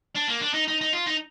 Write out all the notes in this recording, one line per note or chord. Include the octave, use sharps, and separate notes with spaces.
D4
A#3
D4
D#4
D#4
D#4
F4
D#4